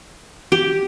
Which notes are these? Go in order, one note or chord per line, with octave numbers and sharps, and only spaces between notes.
G4